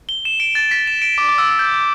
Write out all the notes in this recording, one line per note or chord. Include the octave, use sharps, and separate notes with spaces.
G7
E7
D7
A6
B6
E7
D7
D6
D6
E6
E6
G6